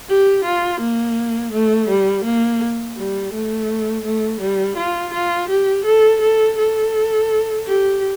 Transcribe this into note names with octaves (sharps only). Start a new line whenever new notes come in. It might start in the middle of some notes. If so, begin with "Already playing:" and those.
G4
F4
A#3
A3
G3
A#3
G3
A3
A3
G3
F4
F4
G4
A4
A4
A4
G4